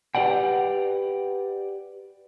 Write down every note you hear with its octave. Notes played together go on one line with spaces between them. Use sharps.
G4 B4 D5 F#5 G5